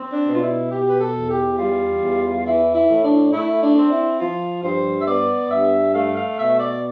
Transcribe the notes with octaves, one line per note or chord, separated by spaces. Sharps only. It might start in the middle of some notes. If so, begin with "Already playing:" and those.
Already playing: C4
D4
B2
F4
E4
B2 G4
B4
A4
E2
G4
G3 F4
E2
E3 E4
E4
A2
D4
A3 E4
D4
C4
E4
F3 F4
G2 C5
E5
B3 D5
G2 E5
A3 F5
F5
B2 E5
D5